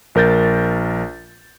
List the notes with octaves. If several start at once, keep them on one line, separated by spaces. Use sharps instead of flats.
A#1 A#4 G6 A6